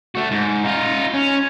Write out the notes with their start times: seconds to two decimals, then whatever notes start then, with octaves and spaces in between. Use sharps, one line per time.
0.15 A3 F#4
0.31 G#2
0.64 D#4 F4
1.14 C#4